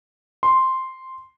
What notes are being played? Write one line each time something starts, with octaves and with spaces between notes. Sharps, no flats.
C6